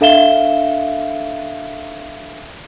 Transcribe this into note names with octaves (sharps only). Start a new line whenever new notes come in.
D4 A4 E5 F5 E7 G7